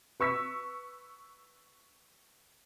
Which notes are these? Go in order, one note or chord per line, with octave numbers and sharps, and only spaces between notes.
B4 C#6 E6 B6